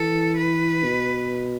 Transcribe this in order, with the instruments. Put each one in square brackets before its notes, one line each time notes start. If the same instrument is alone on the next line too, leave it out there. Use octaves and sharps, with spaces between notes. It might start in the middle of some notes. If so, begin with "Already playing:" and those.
Already playing: [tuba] E3 [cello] A4
[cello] B4
[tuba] B2